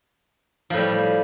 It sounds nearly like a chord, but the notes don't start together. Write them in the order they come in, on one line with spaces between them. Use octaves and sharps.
F3 A2 G3